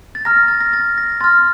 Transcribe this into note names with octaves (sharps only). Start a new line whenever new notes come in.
A6
A#5 F6 A#6
A6
A6
A#6
A6
A#6
C6 F6 A6